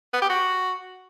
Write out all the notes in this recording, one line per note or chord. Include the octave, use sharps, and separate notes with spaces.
B3
G4
F#4